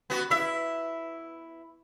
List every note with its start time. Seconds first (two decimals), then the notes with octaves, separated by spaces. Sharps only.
0.10 B3 F#4
0.30 E4 E5